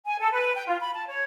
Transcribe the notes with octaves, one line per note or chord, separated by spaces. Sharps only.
G#5
A4
B4
G5
F4
B5
A5
C#5